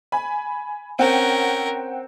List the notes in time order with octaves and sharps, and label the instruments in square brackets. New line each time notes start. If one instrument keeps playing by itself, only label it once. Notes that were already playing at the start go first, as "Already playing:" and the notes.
[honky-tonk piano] G#5 B5
[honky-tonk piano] C4 F#5 G5 [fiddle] C#4 A#4